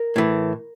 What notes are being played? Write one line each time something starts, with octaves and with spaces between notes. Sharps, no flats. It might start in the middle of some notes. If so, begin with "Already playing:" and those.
Already playing: A#4
A2 E3